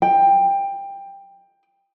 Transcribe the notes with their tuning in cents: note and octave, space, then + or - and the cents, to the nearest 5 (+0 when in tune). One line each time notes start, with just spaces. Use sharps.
G5 +15